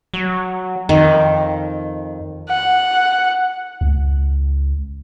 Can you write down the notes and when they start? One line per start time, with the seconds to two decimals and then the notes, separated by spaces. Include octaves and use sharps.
0.14 F#3
0.89 F2 D#3
2.49 F#5
3.81 C#2